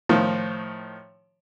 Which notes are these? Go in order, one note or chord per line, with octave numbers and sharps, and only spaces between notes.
A2 D#3 F3